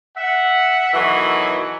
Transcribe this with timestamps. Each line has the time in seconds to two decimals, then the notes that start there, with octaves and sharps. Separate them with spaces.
0.17 E5 F#5
0.94 B2 D#3 E3 F#3 F#4 A4